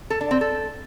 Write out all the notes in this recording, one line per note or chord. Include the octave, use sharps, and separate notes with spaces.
A4
D4
C4
A4